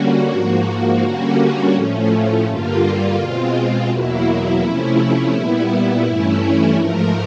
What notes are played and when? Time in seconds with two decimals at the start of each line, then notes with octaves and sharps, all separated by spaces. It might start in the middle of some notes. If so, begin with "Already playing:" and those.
Already playing: D3 G3 A#3 C#4 F#4
0.30 G#2 F3 A#3
1.02 D3 G3 A#3 C#4
1.74 A2 F3 A3 C#4
2.45 G2 D3 G3 A#3 F4
3.17 B2 G#3 C4
3.89 E2 B2 F#3 A#3 E4
4.61 C3 F3 A3 C#4
5.32 A#2 G3 B3 E4
6.04 G2 E3 A3 C#4
6.76 G#2 F3 A3 A#4